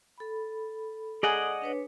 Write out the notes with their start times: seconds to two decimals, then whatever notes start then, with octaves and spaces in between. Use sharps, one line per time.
0.18 A4 B5
1.23 G#4 D5 D#5 F#5
1.62 D4 B4 C#5